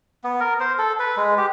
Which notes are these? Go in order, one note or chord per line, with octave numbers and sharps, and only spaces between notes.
B3
A#4
C5
A4
B4
G#3
G4